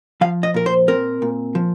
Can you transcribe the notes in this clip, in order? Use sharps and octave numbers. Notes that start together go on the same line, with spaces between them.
F3 F5
D#5
A#2 A#4
C5
C4 A#4
A#2
F3